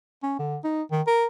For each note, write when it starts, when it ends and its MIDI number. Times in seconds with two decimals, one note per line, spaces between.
0.23 0.36 61
0.39 0.57 50
0.64 0.83 63
0.91 1.02 51
1.07 1.27 70